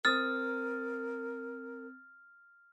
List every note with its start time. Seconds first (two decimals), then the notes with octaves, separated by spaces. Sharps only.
0.05 C4 A#4 D#6 F6 A6